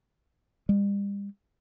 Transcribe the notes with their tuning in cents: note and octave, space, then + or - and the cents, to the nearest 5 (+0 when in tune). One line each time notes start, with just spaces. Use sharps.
G3 +40